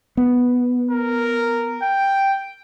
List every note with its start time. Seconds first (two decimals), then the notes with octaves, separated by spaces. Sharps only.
0.17 B3
0.91 A#4
1.82 G5